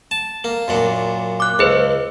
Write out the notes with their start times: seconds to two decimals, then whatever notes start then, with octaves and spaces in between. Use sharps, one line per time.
0.11 A5
0.44 A#3
0.68 F#2 A#2 D4
1.40 D6 F#6
1.59 C#2 G#4 B4 C5